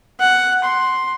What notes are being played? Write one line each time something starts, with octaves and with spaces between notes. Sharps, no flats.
F#5
C6